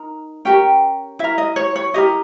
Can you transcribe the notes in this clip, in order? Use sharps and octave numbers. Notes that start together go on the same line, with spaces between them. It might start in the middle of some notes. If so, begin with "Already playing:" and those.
Already playing: D#4 A#4
C#4 G4 A#4 G5
E4 A#4 E5
D#5
C#5
C#5
E4 G4 A#4 D#5